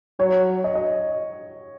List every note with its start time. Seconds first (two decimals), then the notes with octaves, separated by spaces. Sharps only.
0.20 F#3 C#5
0.64 D#5
0.75 D#5